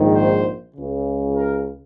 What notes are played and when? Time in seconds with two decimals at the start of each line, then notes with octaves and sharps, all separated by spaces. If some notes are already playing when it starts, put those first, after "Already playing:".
Already playing: A#1 G#2 D#3
0.14 C5
0.75 C#2 C#3
1.36 A#4